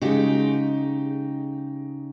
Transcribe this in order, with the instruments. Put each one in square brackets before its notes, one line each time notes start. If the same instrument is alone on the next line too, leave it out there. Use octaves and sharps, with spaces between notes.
[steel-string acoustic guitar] C#3 D#4 G4 [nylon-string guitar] G#3 F#4